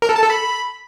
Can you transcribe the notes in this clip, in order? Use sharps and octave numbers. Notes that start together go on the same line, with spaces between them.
A#4
A4
A5
A4
B5